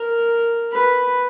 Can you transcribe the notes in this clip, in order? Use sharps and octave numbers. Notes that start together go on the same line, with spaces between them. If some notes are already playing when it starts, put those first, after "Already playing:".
Already playing: A#4
B4